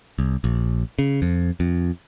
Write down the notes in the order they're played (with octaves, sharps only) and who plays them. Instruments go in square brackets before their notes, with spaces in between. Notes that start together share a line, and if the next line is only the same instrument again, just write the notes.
[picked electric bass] C2
A#1
C#3
F2
F2